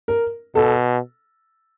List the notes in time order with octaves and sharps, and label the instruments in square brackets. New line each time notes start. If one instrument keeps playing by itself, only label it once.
[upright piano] A#4
[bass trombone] B2 [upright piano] A4